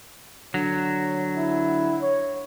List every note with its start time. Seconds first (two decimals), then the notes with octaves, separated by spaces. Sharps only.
0.54 D3 F#3 C#5
1.36 E4
2.02 C#5